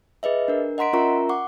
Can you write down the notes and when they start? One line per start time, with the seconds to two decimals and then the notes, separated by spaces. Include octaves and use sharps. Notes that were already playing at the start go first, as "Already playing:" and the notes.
0.23 G#4 B4 D#5 E5
0.48 D4 A#4
0.78 D#5 F#5 A#5 C6 B6 D7
0.93 C#4 F4 A#4 E5 A#5 C#6
1.29 F#5 C#6 D6